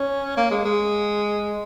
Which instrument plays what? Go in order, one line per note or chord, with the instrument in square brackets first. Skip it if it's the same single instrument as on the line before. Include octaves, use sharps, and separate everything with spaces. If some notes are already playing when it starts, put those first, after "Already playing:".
Already playing: [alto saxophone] C#4
A#3
G#3
G#3